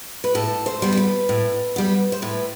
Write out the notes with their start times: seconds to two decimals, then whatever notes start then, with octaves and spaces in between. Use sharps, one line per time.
0.24 B4
0.35 A2 A4
0.66 C5
0.82 G3 B3
0.92 C5
0.97 B4
1.29 A2
1.76 G3 B3
2.12 C5
2.22 A2 B4